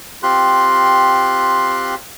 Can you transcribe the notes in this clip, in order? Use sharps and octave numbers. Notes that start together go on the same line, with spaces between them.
C4 F4 G4 C6 F#6